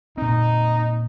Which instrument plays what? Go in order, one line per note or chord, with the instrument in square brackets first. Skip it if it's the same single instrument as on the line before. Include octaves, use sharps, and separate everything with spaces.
[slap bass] A#2 C4 [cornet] D#4